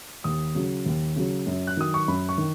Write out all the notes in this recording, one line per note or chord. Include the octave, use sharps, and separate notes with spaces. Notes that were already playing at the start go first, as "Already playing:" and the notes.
D#2 D#6
C#3 F#3
D#2
C#3 F#3
F#2
F#6
D#3 F#3 D#6
C#6
F#2 B5
C#6
D#3